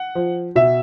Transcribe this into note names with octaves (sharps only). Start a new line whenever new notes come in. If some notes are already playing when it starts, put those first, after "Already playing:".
Already playing: F#5
F3
B2 E5